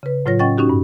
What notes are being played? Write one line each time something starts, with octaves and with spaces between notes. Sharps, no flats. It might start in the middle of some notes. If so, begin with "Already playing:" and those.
C#3 B4
A2 F#3 F4 C#5 A#6
C#4 D#5 F#5 G5 C#6 A6
C#4 D#4 F#4 G4
G2